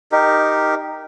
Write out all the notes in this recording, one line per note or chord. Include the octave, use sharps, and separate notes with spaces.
D#4 G4 A#4